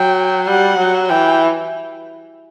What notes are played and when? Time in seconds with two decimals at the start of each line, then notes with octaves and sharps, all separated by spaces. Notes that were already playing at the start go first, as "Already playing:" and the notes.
Already playing: F#3 G5
0.48 G3 F#5
0.78 F#3
1.09 E3 G5